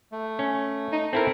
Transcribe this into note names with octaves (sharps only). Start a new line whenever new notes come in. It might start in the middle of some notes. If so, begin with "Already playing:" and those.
A3
C#4
D#4
C4 E4 A4 A#4